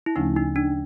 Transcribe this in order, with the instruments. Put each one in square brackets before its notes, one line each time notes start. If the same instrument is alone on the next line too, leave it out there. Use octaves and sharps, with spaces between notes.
[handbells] E4
[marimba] D2 C#3 F3 A3 C#4 [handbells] D#4
[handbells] D#4
D4